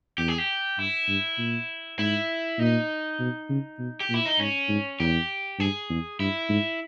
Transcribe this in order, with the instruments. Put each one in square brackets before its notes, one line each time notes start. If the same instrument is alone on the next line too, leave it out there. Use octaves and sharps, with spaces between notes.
[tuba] E2 [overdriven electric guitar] G4
[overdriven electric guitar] G#4
G4
[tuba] G2 [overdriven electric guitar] E4
[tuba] G2
A#2
[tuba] G#2 [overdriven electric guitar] E4
[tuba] A#2 [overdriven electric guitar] D#4
[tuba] B2
C#3
B2
[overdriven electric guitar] G4
[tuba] A#2
[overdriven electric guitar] E4
D#4
[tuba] G#2 [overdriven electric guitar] C#4
[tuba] G#2
[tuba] E2 [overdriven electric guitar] G4
[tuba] G2 [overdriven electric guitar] G#4
[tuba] E2
[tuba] G2 [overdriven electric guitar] E4
[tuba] G#2